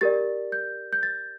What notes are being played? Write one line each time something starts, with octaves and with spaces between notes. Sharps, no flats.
G4 A#4 D5 A6
G6
G6
A6